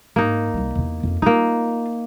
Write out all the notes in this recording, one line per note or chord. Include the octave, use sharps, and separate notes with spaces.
G#2 A#3 D#4
C2 G3
E2 C3
F2 C#4
A#3 D#4 F4